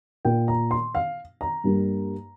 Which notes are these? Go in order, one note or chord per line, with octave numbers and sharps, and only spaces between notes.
A#2 A#3 G5
A#5
C6
F5
A#5
G2 G3 A#3